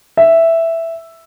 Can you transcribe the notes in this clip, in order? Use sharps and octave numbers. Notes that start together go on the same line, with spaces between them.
E5